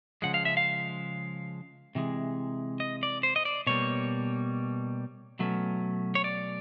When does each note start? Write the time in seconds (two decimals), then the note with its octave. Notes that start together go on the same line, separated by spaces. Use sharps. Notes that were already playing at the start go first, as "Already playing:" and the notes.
0.22 C#3 F3 G#3 F#5
0.34 F5
0.45 E5
0.57 F5
1.95 C3 E3 G#3
2.80 D#5
3.03 D5
3.23 C5
3.36 D#5
3.45 D5
3.67 B2 G3 A#3 C#5
5.39 B2 F#3 A3 C#4
6.15 C#5
6.24 D5